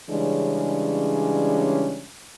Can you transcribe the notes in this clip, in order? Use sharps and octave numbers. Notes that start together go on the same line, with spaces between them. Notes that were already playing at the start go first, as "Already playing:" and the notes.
C#3 E3 G3 G#3 C#4 D4